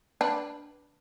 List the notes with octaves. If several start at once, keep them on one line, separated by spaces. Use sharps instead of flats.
D4 B4